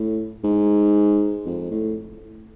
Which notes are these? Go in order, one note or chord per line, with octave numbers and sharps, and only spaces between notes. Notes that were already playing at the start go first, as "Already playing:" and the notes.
Already playing: A2
G#2
F2
A2